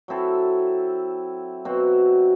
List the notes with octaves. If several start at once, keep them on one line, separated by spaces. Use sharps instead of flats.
F#3 C4 E4 A4
B2 F#3 C4